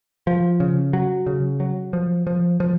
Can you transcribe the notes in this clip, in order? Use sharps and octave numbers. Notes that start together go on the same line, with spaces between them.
F3
C#3
F#3
C#3
F#3
F3
F3
F3